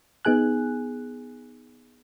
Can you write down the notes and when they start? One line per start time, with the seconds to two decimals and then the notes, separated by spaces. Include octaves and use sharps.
0.25 B3 D#4 G#4 G#5 F#6